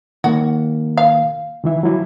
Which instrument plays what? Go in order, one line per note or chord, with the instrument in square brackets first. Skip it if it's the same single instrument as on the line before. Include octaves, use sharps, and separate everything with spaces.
[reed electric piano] D#3 A#3 [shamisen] F#4
[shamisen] F5
[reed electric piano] D#3 E3 E5
F#3 E4